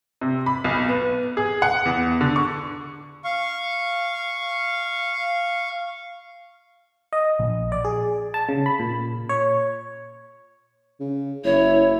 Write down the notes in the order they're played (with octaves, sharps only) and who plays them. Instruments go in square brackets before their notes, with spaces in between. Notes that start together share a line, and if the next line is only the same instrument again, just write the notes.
[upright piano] C3
B5
B1
B3
G#4
F#5
E2
D3
C#6
[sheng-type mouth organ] F5 C#6
[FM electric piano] D#5
A#1
D5
G#4
A5
C#3
B5
A#2
C#5
[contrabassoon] C#3
[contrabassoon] F#1 [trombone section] E4 [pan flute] C#5